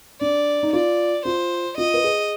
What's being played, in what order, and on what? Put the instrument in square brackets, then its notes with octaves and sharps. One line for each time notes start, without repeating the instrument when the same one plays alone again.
[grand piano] D4 [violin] D5
[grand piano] D#4
[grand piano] F4 [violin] D5
[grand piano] F4 [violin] C5
[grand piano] F4 [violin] D#5
[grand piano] B4
G#4